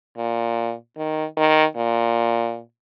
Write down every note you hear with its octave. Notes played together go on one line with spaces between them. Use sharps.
A#2
D#3
D#3
A#2